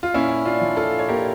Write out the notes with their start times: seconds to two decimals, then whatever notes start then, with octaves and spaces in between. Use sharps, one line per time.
0.03 F4
0.14 A#2 C#4 E4
0.46 D4 F4
0.61 F3
0.77 F4 A4
0.99 C#5
1.09 A#2 G4 A#4